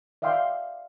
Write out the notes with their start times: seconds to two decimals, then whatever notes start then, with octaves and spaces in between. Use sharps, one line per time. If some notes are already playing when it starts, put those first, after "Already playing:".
0.22 D5 E5 F5 G5 C6